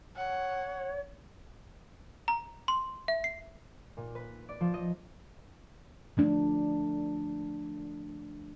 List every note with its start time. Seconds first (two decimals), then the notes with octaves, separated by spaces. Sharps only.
0.16 C#5 F#5
2.28 A#5
2.68 C6
3.08 E5
3.24 C7
3.97 A#2
4.15 B4
4.49 D5
4.61 F3
4.74 D#5
6.17 F3 A3 D4